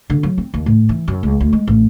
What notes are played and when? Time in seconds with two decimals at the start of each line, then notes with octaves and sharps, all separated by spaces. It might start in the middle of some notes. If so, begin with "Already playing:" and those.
0.10 D3
0.23 F#3
0.38 C4
0.54 D#2
0.66 A2
0.89 E3
1.08 F#2
1.23 C#2
1.40 D2
1.53 G#3
1.67 A1